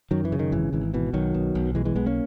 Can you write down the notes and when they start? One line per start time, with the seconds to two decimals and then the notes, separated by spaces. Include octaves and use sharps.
0.11 F#2 D#3 F#3
0.25 E3
0.32 C#3
0.39 D#3
0.52 G#1 E3
0.73 G#1 E3
0.94 B2 E3
1.13 B1 D#3 F#3
1.34 B2
1.55 B1
1.75 B2 E3 G#3
1.85 E3 G#3
1.96 B1 G#3 B3
2.06 A#3 C#4